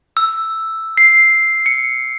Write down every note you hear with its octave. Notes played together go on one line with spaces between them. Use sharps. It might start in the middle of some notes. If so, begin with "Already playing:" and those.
E6
C7
C#7